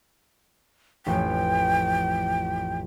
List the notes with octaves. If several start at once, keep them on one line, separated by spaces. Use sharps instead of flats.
A1 F2 G5